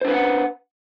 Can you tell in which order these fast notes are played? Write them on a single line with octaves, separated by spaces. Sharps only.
C5 D4 B4 F5 F#5